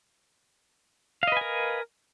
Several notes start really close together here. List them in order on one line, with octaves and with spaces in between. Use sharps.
F5 D#5 B4 G#5 A#4